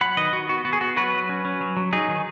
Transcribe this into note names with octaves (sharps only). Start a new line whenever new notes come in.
F#3 F#5 B5
D#3 B4 D#5
D#3 F#4
B3 F#4
B3 F#4
G#4
B3 F#4
F#3 F#4 B4
F#3
C#4
C#4
F#3
F#3
F#3 D#4 G#4
D#3